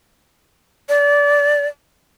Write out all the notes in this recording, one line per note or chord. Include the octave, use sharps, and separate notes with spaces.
D5